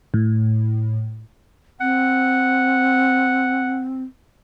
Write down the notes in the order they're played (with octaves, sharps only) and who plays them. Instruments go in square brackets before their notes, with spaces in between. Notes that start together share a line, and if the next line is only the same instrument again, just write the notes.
[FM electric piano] A2
[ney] C4 [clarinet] F#5